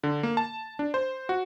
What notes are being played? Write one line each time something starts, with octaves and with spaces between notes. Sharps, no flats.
D3
A#3
A5
D4
C5
F#4